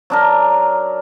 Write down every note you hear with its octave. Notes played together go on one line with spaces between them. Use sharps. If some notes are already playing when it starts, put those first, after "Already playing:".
F#3 D4 A#4